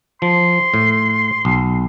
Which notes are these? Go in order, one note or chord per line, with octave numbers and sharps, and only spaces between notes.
F3 C6
A2
B1